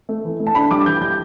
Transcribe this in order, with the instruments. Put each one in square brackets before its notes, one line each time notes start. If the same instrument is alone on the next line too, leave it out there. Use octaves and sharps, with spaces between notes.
[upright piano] A3
E3
A3
A5
D4 B5
G3 D6
E3 G6
G3 G6